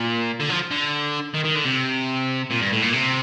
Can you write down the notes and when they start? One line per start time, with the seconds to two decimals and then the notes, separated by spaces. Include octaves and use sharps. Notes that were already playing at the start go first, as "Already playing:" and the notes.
Already playing: A#2
0.40 D3
0.50 F3
0.71 D3
1.34 D#3
1.45 D#3
1.56 D3
1.66 C3
2.50 A#2
2.61 G2
2.72 A2
2.82 A#2
2.93 C3